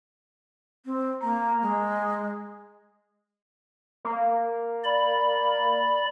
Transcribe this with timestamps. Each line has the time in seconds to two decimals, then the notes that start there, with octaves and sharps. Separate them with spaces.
0.86 C4
1.23 A#3 A#5
1.62 G#3
4.05 A#3
4.84 D5 B5